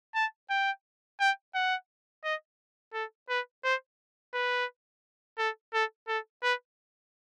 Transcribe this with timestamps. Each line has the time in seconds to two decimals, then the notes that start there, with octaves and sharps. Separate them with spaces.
0.15 A5
0.50 G5
1.20 G5
1.54 F#5
2.24 D#5
2.94 A4
3.29 B4
3.64 C5
4.34 B4
5.38 A4
5.74 A4
6.08 A4
6.43 B4